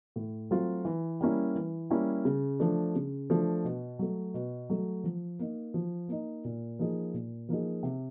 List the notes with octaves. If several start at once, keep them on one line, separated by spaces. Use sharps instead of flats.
A2
F#3 A3 C4 F4
E3
G3 A#3 C#4 E4
E3
G3 A#3 C#4 E4
C#3
F3 A3 D4
C#3
F3 A3 D4
B2
F#3 A3
B2
F#3 A3
F3
A#3 D#4
F3
A#3 D#4
A#2
F3 A#3 D#4 G#4
A#2
F3 A#3 D#4 G#4
C3